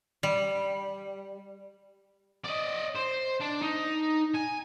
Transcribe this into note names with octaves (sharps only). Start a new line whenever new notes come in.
G3
D5 D#5
C5
D4
D#4
G#5